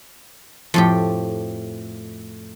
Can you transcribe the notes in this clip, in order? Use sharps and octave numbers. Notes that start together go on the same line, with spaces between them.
F2 A2 G4